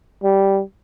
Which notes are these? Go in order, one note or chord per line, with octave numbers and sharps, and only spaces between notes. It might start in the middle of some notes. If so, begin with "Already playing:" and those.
G3